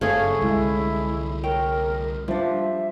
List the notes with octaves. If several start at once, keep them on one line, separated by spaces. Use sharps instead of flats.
F#1 G2 A3 C#4 G#4 F5 G#5
C2 D3 G3 G#3 E4
A#4 C#5 G5
F3 G3 D4 E5